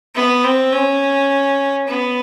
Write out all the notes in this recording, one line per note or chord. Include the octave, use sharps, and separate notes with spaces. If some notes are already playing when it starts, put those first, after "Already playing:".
B3
C4
C#4
B3